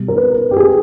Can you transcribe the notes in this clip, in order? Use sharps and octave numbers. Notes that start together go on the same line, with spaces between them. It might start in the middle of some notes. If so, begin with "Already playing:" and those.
Already playing: B2 G3
A#4
B4
G4
G#4